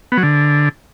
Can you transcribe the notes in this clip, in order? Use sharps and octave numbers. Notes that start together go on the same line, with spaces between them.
B3
F#3
D3